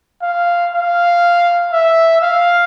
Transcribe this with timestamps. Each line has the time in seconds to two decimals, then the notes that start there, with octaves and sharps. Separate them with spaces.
0.22 F5
0.72 F5
1.72 E5
2.22 F5